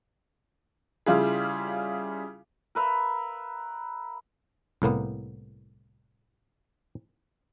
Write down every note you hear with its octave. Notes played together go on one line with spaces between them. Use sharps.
C#3 G3 E4 F4 G#4
A#4 B4 E5 F5
C2 A2 A#3 B3